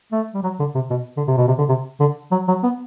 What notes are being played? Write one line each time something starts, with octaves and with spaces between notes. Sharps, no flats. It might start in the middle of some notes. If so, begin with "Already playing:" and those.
A3
G3
F#3
D3
C3
B2
D3
C3
B2
C3
D3
C3
D3
F#3
F#3
B3